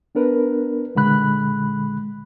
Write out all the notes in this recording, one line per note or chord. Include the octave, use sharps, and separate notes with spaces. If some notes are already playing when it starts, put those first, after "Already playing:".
B3 D4 A#4 B4
C#2 A#2 D3 G#3 B5 F#6